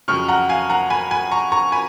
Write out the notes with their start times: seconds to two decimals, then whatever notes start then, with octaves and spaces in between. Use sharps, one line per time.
0.08 F2 C#3 F#3 C#6 F6
0.28 F#5 A#5
0.49 F5 G#5
0.70 F#5 A#5
0.90 G#5 B5
1.11 G#5 B5
1.31 A#5 C#6
1.52 A#5 C#6
1.72 G#5 B5